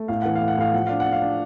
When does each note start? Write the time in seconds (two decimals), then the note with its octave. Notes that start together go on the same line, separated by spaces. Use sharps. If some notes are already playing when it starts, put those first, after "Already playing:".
Already playing: A3
0.08 A2 F5
0.22 E3 F#5
0.35 F5
0.41 A2
0.48 F#5
0.57 A2 F5
0.74 F3 F#5
0.87 D4 F5
1.00 F#5
1.05 D4
1.12 F5
1.22 D4